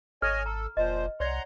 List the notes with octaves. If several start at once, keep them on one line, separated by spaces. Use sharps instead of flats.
G#1 A4 C#5 D#5 G#5 F6
A4 A#5
F1 A#2 F3 C5 D#5
C2 C#5 D5 F#5 A#5 C6